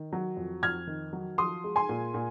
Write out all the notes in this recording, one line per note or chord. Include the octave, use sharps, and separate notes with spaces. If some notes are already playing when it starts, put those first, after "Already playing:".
Already playing: D#3
F#3
F2
F2 F6 G#6
D#3
F#3
F3 C6 D#6
G#3
G#5 C6
A#2
A#2